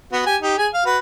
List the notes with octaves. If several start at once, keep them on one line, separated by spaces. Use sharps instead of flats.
B3 F#4
G4 G#5
D#4 G4
G#4 G#5
F5
F#4 B4